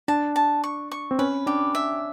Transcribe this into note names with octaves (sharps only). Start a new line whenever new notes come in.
D4 A5
A5
C#6
C#6
C4
C#4 B4
D4 G4
E5